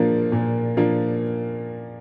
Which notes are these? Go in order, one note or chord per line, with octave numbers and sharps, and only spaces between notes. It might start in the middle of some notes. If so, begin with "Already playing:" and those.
Already playing: A#2 F3 A#3 D4
A#2
F3 A#3 D4